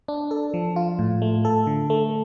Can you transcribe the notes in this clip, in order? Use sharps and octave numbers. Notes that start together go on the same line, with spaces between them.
D4
A4
F3
F4
A2
A3
A4
D3
A3